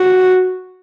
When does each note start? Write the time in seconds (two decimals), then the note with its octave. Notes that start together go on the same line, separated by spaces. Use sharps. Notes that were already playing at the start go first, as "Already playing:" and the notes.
Already playing: F#4